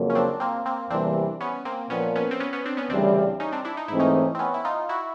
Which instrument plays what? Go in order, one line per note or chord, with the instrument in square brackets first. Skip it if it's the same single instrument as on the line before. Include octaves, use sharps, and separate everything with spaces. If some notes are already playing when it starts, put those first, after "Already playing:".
Already playing: [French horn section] F2 C#3 F#3 A#3
[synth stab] C#4
C4 D4
A#3 C4
A#3 C4
[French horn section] E2 C3 E3 G3 A#3 [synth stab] C4 D4
[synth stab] B3 C#4
A#3 C4
[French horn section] A#2 F3 A#3 [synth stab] B3 C#4
[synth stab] B3 C#4
C4
B3 C#4
B3 C#4
C4 D4
B3 C#4
[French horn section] D2 C#3 E3 G3 [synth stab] C4 D4
[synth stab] C#4 D#4
C4 D4
D4 E4
D#4
[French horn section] G#2 E3 A3 C4 [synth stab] E4
[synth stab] C#4 D#4
C4
B3 C#4
E4
D#4 F4
E4 F#4